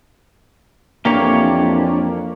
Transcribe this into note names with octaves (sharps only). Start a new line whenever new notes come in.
F2 E3 A#3 D4 G4 C#5